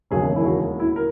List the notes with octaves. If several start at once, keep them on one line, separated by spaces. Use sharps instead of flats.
E1 D#2 C#3 F#3 G#4
E4
F#4
E4
A#4